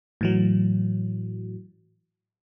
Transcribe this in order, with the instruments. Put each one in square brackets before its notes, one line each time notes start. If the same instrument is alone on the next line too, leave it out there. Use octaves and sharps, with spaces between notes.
[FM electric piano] A2 E3 F#3